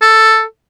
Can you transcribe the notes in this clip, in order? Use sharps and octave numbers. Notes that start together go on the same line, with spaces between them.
A4